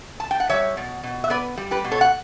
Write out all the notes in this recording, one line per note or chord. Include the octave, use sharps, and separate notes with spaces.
A5
G5
F#5
G3 C#5 E5
B2
B2
E5
B3 B4 D5
G3
G4 B4
B2
A4 C#5
F#5